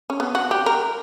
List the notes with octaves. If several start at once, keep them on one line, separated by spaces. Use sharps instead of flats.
C#4
B3
F#4
G4
A#4